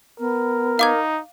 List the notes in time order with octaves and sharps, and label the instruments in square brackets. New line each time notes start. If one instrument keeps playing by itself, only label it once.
[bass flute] B3 [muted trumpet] A#4
[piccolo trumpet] D#4 [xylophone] F5 D6 G#6